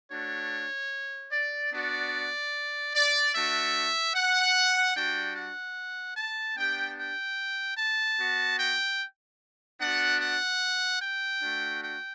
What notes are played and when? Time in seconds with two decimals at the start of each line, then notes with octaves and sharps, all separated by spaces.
0.11 A3 D4 F#4 C#5
1.32 D5
1.72 B3 D4 F#4 D5
2.94 D5
3.35 A3 D4 F#4 E5
4.15 F#5
4.95 G3 D4 F#4 G5
5.37 F#5
6.16 A5
6.57 B3 D4 G4 G5
6.98 G5
7.78 A5
8.19 B3 F#4
8.59 G5
9.81 B3 D4 F#4 F#5
10.21 F#5
11.01 G5
11.42 A3 D4 F#4
11.82 G5